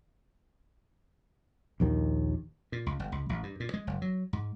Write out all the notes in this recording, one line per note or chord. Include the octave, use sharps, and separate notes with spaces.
A#1 D#2 D#3
A#2
C#2
G1
C#2
A1
G2
A#2
G#3
F#1
F#3
G#2